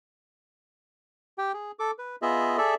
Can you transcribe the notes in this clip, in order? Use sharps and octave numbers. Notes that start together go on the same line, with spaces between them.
G4 G5
G#4
A4 D6
B4
B3 F4 G#4 D#5 E5
G#4 A4 D5 E5